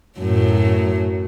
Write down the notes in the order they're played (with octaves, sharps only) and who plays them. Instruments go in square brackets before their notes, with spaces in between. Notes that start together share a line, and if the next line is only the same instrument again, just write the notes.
[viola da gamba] F#2 A2 F#3